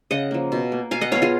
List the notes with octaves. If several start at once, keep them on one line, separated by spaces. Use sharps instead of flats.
C#3 D#5 F#5
F3 A#3
B2
A#3
B2 F5 G#5
D#5 F#5
F#3 B3 C#5 F5
F4 G#4